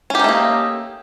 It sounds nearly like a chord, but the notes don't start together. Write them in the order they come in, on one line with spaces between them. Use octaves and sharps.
C#4 G4 D#4 A3 A#3